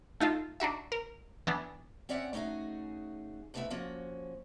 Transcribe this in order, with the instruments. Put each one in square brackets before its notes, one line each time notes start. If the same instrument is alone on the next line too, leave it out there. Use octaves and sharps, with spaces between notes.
[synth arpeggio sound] A3 D#4 F4 A4
D4 D#4 F#4 E5
A#4
E3 B3 D4
[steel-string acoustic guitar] C4 C#4 D5 E5 F#5
A3 C#4 D#4 F#4 G#4
G#2 A3 B3 C#4 E4 E5
F3 A#3 C#4 F#4